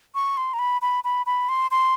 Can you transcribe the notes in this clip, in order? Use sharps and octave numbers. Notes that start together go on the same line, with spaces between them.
C#6
C6
A#5
B5
B5
B5
B5
C6
C6